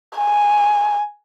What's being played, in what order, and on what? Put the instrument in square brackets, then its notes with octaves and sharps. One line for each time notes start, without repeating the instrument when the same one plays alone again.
[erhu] G#5